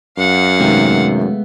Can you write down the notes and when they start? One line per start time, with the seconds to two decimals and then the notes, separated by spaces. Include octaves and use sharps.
0.18 F#2 F5 F#5
0.60 C3 D#3 G#3 A3 B3